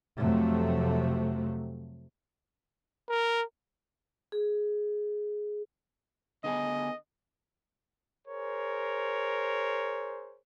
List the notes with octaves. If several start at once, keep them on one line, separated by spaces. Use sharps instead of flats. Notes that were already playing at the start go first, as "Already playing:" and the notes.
F2 C3 F#3 A3
A#4
G#4
D3 B3 G#4 D#5
G#4 A#4 C5 C#5